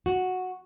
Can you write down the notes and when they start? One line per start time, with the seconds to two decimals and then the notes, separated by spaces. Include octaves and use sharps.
0.06 F#4